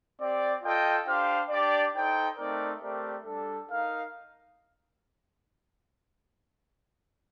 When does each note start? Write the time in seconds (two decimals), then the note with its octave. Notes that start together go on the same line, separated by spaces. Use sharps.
0.19 C4 G4 D5
0.62 F4 A4 D#5 G5
1.06 D4 G4 C5 F5
1.50 D4 G4 D5
1.94 D#4 A4 C5 G5
2.38 A3 C4 D#4 A#4 D5
2.81 A3 C4 G4 A#4 D5
3.25 G3 D4 A4
3.69 D#4 A#4 F5